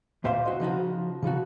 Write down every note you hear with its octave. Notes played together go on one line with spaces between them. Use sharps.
D2 A#2 C5 E5 F5 C6
F#4 C5 D#5
C#3 F3 D#4 F#4
C#3 F3 D#4 F#4